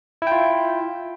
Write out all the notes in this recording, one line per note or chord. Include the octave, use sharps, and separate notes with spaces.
E4 F4 G5